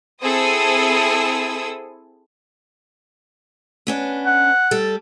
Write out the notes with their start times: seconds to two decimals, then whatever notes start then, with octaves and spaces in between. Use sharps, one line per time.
0.22 C4 E4 G#4 A4 D#6 E6
3.87 B3 C#4 D4
4.26 F#5
4.71 G3 A4